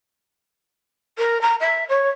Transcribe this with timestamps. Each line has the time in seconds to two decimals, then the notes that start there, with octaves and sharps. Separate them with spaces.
1.18 A#4
1.41 A#5
1.60 E5
1.89 C#5